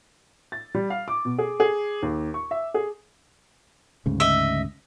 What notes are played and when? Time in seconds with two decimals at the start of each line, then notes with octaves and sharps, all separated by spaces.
0.52 A6
0.75 G3
0.90 F5
1.08 D6
1.25 B2
1.38 G#4
1.60 G#4
2.02 D#2
2.34 C#6
2.51 E5
2.74 G#4
4.06 D2 G#2 C#3
4.20 D#5 E5